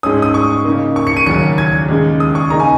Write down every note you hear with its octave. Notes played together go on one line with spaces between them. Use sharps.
G#2 G#3 C#4 D#6
D#6
C#6
C#3 A#3 D#4
C#6
C#7
D#7
D#2 C#3 F#3 C#4 C#7
G#6
D#2 C#3 G#3
D#6
C#6
C#3 A#3 D#4 A#5
G#5